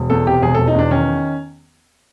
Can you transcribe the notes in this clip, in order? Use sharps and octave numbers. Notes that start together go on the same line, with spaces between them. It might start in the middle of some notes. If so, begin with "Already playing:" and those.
Already playing: E1
E2 A4
C3 G4
E1 G#4
E1 A4
D#4
E2 D4
D#3 C#4